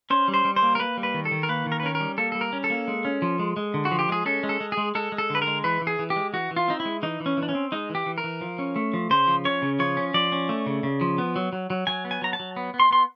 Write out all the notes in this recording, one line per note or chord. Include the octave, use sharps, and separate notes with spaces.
C#4 C5
G3
C5
G3
C5
A#3
A#4
A#3 B4
G3
B4
D#3
A4
D#3
A#4
A#3 B4
D#3
A#4
B4
C#4 A#4
A#4
G3
A#3 A4
G3 A4
A#4
C#4
A4
A#3
G#3
C#4
F3
G#3
G#3
D3
F#4
F3
G4
G#3 G#4
C#4 A4
G#3
A4
G#3
G#4
G#3
G#3 A4
G#3
A4
D3
B4
G#3 A#4
E3 B4
E3
G#4
E3
G4
G#3
E3 F#4
E3
F4
C4 D#4
E4
G#3
E3 D#4
E3
C#4
E3
D4
C#4
C4
G#3 D#4
E3
G4
E3
A#4
E3
F3
C#4
A3
F3
C#3 C5
F3
C#4 C#5
C#3
F3 C#5
C#4
F3 D5
C#4
A3
C#3
C#3
F3
B3
F#3
F#3
F#3
F#3 G#5
B3
G#5
F#3 A#5
A5
F#3
B3
B3
C6
B3 C6